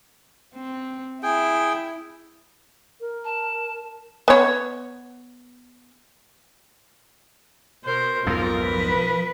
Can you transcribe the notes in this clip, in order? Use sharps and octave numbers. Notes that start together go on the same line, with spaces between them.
C4
E4 G#4 G5
A#4
A5
B3 C#5
B2 A#4 C5
B1 F2 G#2 F4 A#4
F3 B4